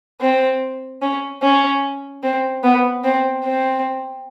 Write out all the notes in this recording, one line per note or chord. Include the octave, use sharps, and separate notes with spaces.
C4
C#4
C#4
C4
B3
C4
C4